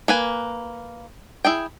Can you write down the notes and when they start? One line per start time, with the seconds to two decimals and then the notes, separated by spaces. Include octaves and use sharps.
0.08 A#3 B4 G#5
1.45 E4 G#4 G5